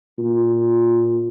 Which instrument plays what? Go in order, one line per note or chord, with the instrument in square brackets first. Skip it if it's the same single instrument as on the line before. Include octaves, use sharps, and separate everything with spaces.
[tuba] A#2